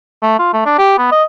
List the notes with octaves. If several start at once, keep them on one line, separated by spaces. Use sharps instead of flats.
A3
F4
A3
D4
G4
B3
D#5